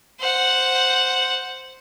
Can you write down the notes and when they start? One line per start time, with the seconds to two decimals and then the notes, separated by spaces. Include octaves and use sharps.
0.19 C5 F#5